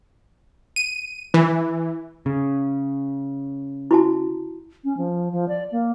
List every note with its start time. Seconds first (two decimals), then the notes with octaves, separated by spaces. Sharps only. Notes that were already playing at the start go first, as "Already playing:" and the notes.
0.76 D#7
1.34 E3
2.26 C#3
3.91 E4 F#4 A5
4.84 C#4
4.97 F3
5.32 F3
5.48 D5
5.72 A#3